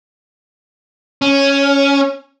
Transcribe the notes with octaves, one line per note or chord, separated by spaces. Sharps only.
C#4